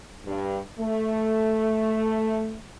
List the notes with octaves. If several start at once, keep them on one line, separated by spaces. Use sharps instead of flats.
G2
A3